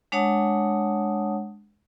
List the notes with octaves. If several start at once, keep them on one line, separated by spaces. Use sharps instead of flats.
G#3 D4 C#5 F#5 A5 D#6